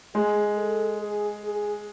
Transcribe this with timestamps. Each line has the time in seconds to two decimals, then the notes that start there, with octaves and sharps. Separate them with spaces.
0.14 G#3 G#4
0.57 A4
1.01 G#4
1.44 G#4